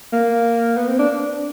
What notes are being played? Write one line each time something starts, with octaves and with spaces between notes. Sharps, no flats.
A#3
B3
C4
D4